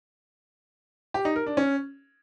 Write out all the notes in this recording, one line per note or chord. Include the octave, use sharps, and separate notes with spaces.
G4
D#4
A#4
D4
C#4